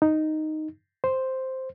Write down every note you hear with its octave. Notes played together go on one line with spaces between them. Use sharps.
D#4
C5